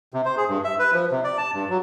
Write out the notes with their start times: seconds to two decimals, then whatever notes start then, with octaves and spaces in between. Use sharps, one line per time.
0.14 C3
0.25 C5
0.37 G#4
0.49 G2
0.64 E5
0.79 B4
0.94 F3
1.11 C3
1.24 D5
1.38 A5
1.54 G2
1.69 F#3